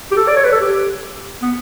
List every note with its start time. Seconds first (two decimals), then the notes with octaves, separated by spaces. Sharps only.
0.11 G4
0.17 A4
0.28 D5
0.36 C#5
0.44 B4
0.52 A4
0.61 G4
1.42 B3